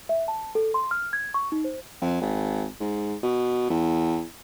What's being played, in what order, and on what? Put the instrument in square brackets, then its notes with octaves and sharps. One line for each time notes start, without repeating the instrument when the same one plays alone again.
[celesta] E5
A5
A4
C6
F6
G#6
C#6
D#4
C5
[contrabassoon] F2
G#1
G#2
B2
E2